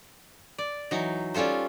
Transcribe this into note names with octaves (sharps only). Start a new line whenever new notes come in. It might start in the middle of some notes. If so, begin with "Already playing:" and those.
D5
E3 F#3 D#4
G3 C#4 F4 A4 C5